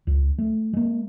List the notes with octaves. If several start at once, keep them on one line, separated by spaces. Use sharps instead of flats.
C#2
A3
G#3 A#3